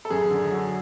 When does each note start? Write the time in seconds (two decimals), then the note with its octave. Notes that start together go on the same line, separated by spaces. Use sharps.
0.05 A4
0.10 F#2 G#4
0.30 D3
0.51 F#3